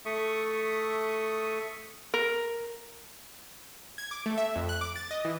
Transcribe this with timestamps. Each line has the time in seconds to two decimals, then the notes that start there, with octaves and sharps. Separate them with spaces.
0.05 A3 A4 E5 C#6 D#6
2.14 A#4
3.98 G#6
4.11 D6
4.26 A3
4.38 E5
4.56 F2
4.69 F#6
4.81 D6
4.96 A6
5.11 D#5
5.25 E3